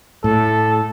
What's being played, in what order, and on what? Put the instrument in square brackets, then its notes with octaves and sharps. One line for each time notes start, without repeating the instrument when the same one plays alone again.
[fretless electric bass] A2 [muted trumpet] A4